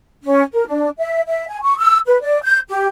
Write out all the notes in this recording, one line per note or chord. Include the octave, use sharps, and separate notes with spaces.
C#4
A#4
D4
E5
E5
G#5
C#6
E6
B4
D5
G6
G4